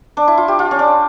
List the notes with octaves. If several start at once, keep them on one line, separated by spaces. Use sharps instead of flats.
D4
E4
F4
G4
F4
C#4
D4